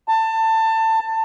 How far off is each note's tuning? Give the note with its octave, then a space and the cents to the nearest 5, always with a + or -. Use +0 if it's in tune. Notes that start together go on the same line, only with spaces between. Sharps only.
A5 +25